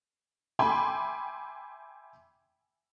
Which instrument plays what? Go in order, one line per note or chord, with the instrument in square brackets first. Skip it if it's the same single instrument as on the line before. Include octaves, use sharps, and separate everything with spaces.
[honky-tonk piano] E5 G5 G#5 B5 C6 D6